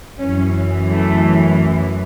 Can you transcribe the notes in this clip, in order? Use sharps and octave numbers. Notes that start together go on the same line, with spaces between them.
F#2 E3 C#4
A3